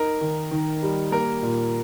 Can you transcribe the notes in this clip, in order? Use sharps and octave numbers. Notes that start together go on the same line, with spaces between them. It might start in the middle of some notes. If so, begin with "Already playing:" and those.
Already playing: D#4 A#4
D#3
D#3
G3
A#3 A#4
A#2